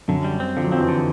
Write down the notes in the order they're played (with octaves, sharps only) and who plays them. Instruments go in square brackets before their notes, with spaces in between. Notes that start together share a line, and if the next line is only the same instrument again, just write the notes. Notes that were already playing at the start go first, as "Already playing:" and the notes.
[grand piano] F#2 F#3 [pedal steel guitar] D3
[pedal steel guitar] G3
C4
[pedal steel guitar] D3 [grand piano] F3
[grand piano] F#3
[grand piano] F2 F3 [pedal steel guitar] C4
[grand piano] E3
[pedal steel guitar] D3